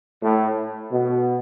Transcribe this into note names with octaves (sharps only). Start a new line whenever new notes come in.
A2
B2